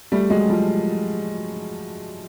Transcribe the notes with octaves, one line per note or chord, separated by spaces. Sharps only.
G3 A3
F#3 G#3
F3 G3